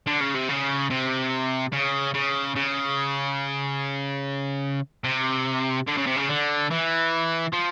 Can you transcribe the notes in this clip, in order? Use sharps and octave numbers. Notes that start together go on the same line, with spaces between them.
D3
C#3
C3
C#3
C3
C#3
C#3
C#3
C3
D3
C#3
C3
C#3
D3
E3
F3